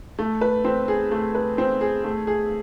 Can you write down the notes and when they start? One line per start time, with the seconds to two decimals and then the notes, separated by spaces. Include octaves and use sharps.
0.19 A3
0.41 B4
0.65 C4
0.88 G#4
1.11 A3
1.35 B4
1.58 C4
1.81 G#4
2.04 A3
2.27 G#4